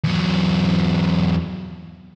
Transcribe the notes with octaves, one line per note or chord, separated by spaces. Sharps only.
E2 F#3